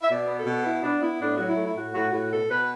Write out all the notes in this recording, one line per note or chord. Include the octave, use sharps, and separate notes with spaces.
E5
B2 D5
B3
A4
B2
B3 E4
B3 D4
B3 E4
A2 D4
F#3 F#4
E4
A3
E4
A2 F#4
A2 F#4
A2 F#4
B2 A4
B2 B4